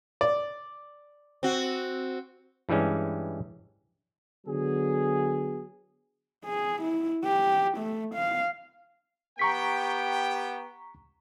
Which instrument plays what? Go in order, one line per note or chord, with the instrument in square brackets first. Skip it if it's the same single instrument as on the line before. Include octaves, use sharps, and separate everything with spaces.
[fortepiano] D5
[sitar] C4 F#4
[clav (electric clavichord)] G2 E3 G3 G#3 C#4
[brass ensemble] D3 F#3 B3 G#4
[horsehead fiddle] G#4
E4
G4
A3
F5
[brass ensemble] B3 G4 G5 [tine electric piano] A#5 C#6 B6